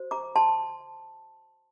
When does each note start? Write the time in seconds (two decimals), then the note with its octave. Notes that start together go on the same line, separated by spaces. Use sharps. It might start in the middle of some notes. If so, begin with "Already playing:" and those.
Already playing: F#4 C5
0.11 A#5 D6
0.36 A5 C6